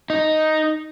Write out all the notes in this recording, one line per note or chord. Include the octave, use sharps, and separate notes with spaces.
D#4